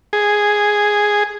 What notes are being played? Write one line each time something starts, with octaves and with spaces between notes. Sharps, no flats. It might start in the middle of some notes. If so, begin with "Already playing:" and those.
G#4